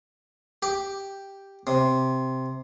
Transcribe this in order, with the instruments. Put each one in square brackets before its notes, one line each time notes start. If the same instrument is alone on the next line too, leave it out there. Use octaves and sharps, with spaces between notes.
[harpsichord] G4
C3